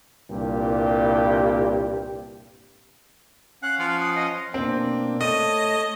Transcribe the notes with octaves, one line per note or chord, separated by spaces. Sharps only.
C2 G2 A#2 G4
C#4 F5 F#5 F#6
F3 F6
D#6
D#5
B2 A#3 C4 D4
A3 C#5 D#5 A5 D#7